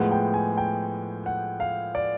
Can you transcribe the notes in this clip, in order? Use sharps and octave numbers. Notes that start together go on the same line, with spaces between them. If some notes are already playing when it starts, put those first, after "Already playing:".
Already playing: A2 F3 G#3 B3 F#5
G5
G#5
G5
F#5
F5
D5